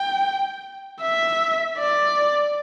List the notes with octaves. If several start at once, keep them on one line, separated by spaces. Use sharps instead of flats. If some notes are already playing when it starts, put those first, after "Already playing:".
Already playing: G5
E5
D5